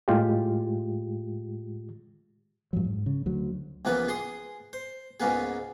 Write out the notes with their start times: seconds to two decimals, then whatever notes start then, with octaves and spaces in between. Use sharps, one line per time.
0.08 A2 G#3 F4 G4
2.73 G2 F3 F#3
2.85 G#2
3.06 C#3
3.26 D2 F#3
3.85 C#2 E3 F3 A#3 B3 B4
4.08 G#4 C6 D#6
4.73 C5
5.20 C#2 G#2 C#3 A#3 B3 G#4